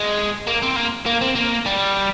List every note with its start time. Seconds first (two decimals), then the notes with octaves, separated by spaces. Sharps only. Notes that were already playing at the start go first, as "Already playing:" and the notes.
Already playing: G#3
0.47 A#3
0.62 C4
0.76 A#3
1.06 A#3
1.21 C4
1.35 A#3
1.66 G3